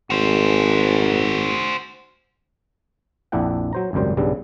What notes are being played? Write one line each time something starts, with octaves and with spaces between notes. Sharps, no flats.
G#1 F#4 C5
A#1 F2 D4 E4 F#5 G5
F#3 C5 A#5
G#1 C#2 F#2 G3 C5
B1 G2 C#3 G3